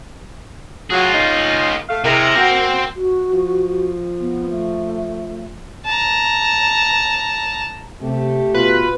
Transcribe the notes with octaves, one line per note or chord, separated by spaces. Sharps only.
F#3 F4 G#4
A#3 C#4 D#4
A3 F5
C3 G#3 E4 A#4
A#3 C4 F#4 C5
F#4
F3
B3
A3
A5 A#5
C3 A3 G4
B2 F4 B4